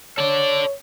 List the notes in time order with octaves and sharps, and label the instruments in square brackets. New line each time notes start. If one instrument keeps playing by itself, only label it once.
[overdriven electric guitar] A4 D5 [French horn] C#5